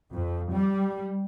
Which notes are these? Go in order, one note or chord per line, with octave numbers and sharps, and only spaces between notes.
F2
G3